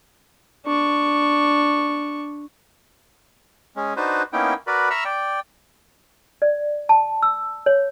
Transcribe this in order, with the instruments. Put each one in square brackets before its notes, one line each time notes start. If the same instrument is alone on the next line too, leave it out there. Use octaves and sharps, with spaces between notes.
[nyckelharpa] D4 C#6
[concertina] G#3 C#4
D4 D#4 F#4 B4 C5
A#3 B3 C#4 D#4 E4 G5
F#4 A#4 B4 D5 B5
E5 A#5 B5 C#6 E6 F6
D5 G5
[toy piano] D5
A5
E6
C#5